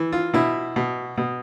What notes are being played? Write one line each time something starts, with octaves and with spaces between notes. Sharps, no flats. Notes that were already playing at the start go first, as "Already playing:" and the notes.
Already playing: E3
F4
B2 E4
B2
B2